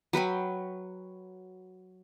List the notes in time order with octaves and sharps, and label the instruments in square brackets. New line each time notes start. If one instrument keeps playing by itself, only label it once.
[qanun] F#3 B4 G5 B5